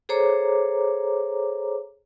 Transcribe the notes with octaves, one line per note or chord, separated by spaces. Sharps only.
G#4 A4 C5 C#5 A#5 D6